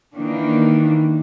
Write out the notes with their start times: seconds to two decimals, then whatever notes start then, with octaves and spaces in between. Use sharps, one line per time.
0.15 D#3 E3 A#3 D4